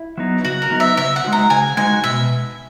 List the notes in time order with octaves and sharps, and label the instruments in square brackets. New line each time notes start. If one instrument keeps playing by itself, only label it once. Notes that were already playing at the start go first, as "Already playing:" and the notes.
Already playing: [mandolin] E4
[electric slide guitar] F#3 B3 D#4
[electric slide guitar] C#3 [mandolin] F#4
[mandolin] A#4
[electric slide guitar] F#3 B3 D#4
[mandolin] E5
[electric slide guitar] C#3 [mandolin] E5
[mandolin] F#5
[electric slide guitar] G#3 D#4 F#4
[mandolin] A#5
[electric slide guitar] C#3 [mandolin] G#5
[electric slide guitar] G#3 D#4 F#4 [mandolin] G#5
[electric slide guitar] B2 [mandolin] E5